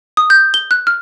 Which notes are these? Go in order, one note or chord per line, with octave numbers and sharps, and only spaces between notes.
D#6
G6
G7
F#6
F6